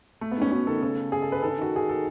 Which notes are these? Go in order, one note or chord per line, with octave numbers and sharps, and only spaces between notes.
A3
B3
G#2 C#4
B2 C#4
D#3 A4
C#3 A4
G#4
A4
B4
D#3 A4
C#3
D#3 F#4
G#4
A4